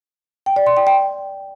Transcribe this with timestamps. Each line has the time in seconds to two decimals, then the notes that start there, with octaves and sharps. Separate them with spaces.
0.46 G5
0.56 D5
0.67 C6
0.77 G5
0.87 G5